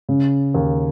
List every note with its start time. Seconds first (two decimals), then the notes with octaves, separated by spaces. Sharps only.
0.09 C#3
0.54 D#2